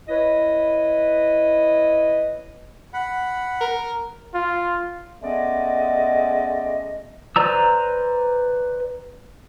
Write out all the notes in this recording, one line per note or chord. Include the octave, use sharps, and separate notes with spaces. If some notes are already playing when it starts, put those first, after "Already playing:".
E4 B4 C#5 D#5
F#5 B5
A#4
F4
G#3 A3 B3 C#4 D5 D#5
B4 C5 D5 A#5 E6